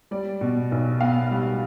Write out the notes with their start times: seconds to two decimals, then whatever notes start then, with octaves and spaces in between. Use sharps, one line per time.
0.11 G3 D5
0.41 B2
0.72 B1
1.01 B3 F5
1.31 G3